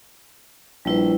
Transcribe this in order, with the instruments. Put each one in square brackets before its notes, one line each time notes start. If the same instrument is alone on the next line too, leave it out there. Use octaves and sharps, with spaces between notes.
[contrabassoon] A#1 [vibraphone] G3 E4 B4